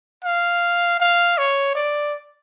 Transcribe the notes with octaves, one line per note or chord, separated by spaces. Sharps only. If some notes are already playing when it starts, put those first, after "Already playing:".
F5
F5
C#5
D5